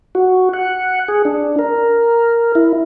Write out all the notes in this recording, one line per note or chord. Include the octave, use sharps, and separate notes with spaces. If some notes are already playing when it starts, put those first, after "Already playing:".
F#4
F#5
G#4
D4
A#4
E4